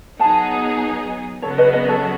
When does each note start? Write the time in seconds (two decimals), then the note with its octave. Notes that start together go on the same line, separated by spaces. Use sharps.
0.19 F#3 B3 D#4 G#4 F#5 A5
1.42 C#3 F#3 B3 F#4 A4 C#5
1.58 B4 D#5
1.73 B4 D#5
1.88 A4 C#5